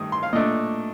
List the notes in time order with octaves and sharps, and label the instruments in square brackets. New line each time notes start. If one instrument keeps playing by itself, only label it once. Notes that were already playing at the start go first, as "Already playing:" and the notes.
Already playing: [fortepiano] G2 D#3 A3 D#6
C6
F5
A#2 A3 D4 D#5